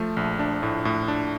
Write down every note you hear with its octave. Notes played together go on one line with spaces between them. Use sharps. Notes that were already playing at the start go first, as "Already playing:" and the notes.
Already playing: F3 A3
A#1
D4
A2
A2
D4